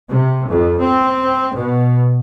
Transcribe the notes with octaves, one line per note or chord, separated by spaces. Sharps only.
C3
F2
C4
B2